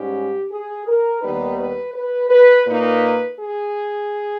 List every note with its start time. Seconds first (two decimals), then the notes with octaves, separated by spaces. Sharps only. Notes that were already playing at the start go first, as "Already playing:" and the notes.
Already playing: G#2 G3 C#4 G4
0.51 G#4
0.87 A#4
1.22 D#2 D#3 G3 B3 D#4 B4
1.58 B4
1.95 B4
2.30 B4
2.66 A#2 A#3 D#4 B4
3.39 G#4